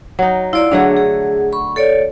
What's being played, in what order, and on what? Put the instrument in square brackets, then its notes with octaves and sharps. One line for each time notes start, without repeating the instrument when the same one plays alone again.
[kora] F#3 D#4
[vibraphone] E4 D5 [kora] F4
[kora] D3 F#3 A3 [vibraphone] D4 G#4
[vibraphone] G#4
B5 C#6
A4 C#5 D5